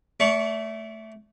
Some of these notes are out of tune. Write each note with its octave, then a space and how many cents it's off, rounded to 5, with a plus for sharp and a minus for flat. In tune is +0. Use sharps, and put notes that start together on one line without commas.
A3 +0 D5 -35 C#6 +0